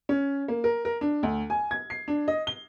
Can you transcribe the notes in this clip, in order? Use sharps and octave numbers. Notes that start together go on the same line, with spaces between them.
C#4
A#3
A#4
A#4
D4
D2
G#5
G#6
C7
D4
D#5
G7